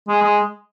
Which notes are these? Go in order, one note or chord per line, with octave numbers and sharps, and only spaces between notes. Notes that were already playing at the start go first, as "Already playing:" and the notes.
G#3
G#3